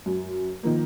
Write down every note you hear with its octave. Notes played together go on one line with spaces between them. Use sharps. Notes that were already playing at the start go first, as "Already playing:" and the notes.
F#2
D#3 F3 A#3